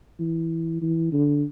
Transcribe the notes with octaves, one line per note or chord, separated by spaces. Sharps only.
E3
E3
D3